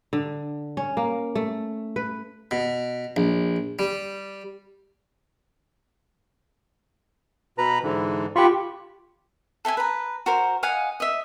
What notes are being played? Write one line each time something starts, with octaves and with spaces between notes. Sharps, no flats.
D3
C#4
A#3
A3
B4
B2
A#1
G3
B2 B4 A#5
G#2 D3 E3
F4 G4 B5 C#6
A4 E5 G5 G#5
B4 A#5
F#4 A#4 C5
D#5 F5 F#5 G#5
D#5 E5